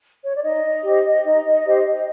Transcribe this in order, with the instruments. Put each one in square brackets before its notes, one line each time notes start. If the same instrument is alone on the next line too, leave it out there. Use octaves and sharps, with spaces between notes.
[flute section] C#5
D5
D#4 D#5
G4 C5
D#4
G4 C5